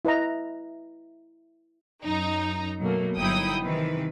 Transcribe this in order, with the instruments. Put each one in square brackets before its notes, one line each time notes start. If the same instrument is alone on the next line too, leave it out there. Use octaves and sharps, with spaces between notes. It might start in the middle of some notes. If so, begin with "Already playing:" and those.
[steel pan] E4 B4 D#5 A#5
[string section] F#2 D#4 A#5
B2 F#3 A3 A#3
G1 F#3 D#4 E4 G5 D#6
C3 D#3 E3 B4